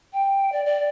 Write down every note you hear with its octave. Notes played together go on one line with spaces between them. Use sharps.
G5
D5
D5